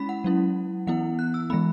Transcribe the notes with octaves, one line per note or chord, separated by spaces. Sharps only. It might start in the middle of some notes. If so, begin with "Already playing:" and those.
Already playing: G#3 C#4 E4 B5 B6
F#5
F#3 C#4 E4
E3 B3 E4 F#5
F#6
E6
E3 G#3 B3 B5